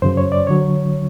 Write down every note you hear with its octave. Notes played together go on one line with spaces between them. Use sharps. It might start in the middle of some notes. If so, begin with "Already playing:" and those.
F#2 C#3 F#3 C5
C#5
D5
D3 F#3 C#5